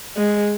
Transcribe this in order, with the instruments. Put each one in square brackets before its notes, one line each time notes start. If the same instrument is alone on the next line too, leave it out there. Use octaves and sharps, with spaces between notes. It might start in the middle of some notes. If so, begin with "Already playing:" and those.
[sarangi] G#3